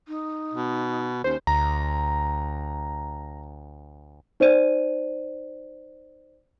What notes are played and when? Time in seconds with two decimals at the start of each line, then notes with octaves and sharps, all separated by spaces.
0.08 D#4
0.54 B2
1.24 D#2 C#4 C5
1.47 D2 A#5
4.40 D#4 C5 D5 D#7